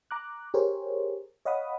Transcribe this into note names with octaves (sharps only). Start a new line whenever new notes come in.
A#5 D6 F#6
G4 G#4 A#4 C5 C#5
C#5 D#5 F5 F#5 B5 D#6